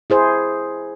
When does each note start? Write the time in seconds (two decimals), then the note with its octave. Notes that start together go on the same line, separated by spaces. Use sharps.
0.10 E4 G#4 C5